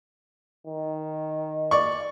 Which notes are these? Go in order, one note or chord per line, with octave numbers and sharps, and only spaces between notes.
D#3
D5 C#6